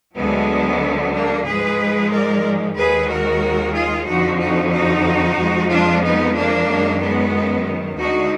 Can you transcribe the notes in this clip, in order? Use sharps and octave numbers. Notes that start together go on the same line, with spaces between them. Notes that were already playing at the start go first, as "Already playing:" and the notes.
D2 D3 F#3 G#3 B3
A#3 D4
G#2 F3 G#3 G#4 B4
A#4 D5
D#2 D#3 G#3 G#4 B4
F#4 A#4
F4 G#4
F2 D3 F3 D#4 F#4
D#4 F#4
D#4 F#4
F2 F3 G#3
D4 F4
B3 D#4
A#3 D4
F#2 D#3 G#3
G#3 B3
D2 D3 G#3 D#4 F#4